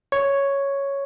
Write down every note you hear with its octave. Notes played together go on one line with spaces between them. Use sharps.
C#5